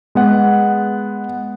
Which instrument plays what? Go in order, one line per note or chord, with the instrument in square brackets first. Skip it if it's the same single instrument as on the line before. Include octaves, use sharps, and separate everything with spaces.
[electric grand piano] G#3 B3 F#5